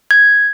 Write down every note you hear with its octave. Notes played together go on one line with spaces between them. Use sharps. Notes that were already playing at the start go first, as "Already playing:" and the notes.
G#6